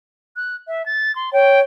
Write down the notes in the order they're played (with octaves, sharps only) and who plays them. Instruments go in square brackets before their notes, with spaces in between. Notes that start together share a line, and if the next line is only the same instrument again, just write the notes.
[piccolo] F#6
E5
A6
C6
[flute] C#5 [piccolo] G5